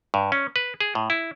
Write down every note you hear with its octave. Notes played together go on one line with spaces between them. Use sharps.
G2
C#4
B4
G#4
A2
E4